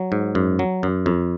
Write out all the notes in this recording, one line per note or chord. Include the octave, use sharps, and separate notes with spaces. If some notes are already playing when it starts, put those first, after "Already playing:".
Already playing: F#3
G#2
F#2
F#3
F#2
F2